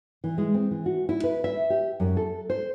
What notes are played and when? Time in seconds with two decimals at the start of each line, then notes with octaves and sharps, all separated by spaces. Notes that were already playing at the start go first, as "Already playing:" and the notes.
0.24 E3
0.38 G#3
0.54 C4
0.71 E3
0.86 F#4
1.09 E4
1.24 B4
1.44 E5
1.70 G4
2.00 F#2
2.17 A4
2.50 C5